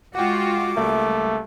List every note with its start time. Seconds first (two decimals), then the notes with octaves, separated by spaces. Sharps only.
0.15 G#3 F4 F#4 F#5 G5 D6
0.77 C#2 G3 A3 A#3 E5